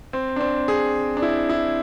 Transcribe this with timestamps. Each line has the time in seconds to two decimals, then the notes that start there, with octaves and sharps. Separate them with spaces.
0.13 C4
0.36 D4
0.41 C4
0.68 G#4
1.17 D4
1.22 E4
1.49 E4